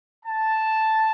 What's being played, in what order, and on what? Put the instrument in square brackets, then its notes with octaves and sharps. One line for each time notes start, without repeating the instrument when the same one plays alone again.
[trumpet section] A5